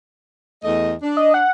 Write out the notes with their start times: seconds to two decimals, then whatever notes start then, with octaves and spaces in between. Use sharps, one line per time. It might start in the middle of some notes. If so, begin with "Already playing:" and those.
0.64 E2 A3 D#5
1.02 D4
1.17 D#5
1.34 F#5